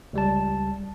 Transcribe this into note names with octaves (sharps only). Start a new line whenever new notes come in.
C#2 G3 A5